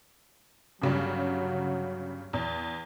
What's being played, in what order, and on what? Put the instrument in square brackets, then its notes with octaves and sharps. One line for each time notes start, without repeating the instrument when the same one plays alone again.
[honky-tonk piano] G1 C#3 G3 [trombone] F#3
[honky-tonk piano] E2